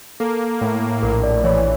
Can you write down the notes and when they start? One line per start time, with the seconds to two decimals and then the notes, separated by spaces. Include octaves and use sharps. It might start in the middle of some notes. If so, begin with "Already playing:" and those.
0.20 A#3 A4
0.61 A2
1.03 A#1 A#4
1.23 D5
1.44 E3 C#5